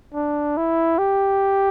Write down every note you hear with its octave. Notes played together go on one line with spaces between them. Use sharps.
D4
E4
G4